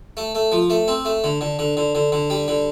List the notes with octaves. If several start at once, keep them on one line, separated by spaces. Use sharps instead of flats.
A3
A3
F3
A3
C4
A3
D3
D3
D3
D3
D3
D3
G3
D3